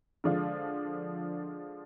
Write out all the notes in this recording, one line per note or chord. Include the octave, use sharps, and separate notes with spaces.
D3 F3 G#3 D4 F4